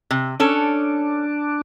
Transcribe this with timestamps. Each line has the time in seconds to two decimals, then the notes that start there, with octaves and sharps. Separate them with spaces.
0.11 C3
0.40 C#4 D4 A4 C#5